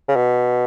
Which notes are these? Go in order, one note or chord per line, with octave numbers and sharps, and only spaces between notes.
C#3
B2